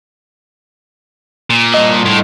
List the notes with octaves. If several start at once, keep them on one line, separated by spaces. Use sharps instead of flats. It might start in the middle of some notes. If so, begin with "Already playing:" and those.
A#2
G2 D#5
A2